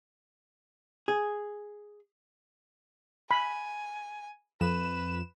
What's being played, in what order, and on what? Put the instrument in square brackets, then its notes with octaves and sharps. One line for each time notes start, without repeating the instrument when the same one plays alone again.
[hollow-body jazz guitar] G#4
[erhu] G#5 [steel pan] B5
[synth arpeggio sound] F2 E7 [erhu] B4